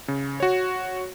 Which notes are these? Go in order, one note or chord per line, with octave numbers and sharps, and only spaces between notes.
C#3
F#4 C#5